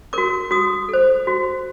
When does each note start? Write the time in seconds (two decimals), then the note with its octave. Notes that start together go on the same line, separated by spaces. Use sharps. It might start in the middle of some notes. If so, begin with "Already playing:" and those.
0.13 F#4 A#4 D6
0.51 F#4 D#6
0.89 A4 C5
1.27 F#4